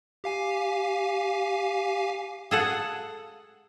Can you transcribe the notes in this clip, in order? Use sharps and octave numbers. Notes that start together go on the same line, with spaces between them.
G4 F5 G#5
G#4 A4 F#5